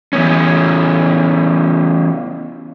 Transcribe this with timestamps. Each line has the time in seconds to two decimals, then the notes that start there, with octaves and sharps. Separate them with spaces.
0.13 E3 B3 C#4